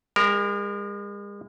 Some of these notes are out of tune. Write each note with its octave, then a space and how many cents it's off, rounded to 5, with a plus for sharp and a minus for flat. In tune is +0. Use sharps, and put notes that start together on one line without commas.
G#3 -40 A#4 +0